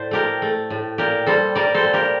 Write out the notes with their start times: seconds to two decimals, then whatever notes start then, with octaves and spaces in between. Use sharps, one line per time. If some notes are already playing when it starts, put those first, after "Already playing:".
Already playing: A2 C5 D5
0.11 A3 G4 A#4
0.42 A3
0.70 A2
0.98 A#2 G4 A#4
1.26 G3 A4 C5
1.55 G3 A#4 D5
1.74 A4 C5
1.84 A#2
1.93 G4 A#4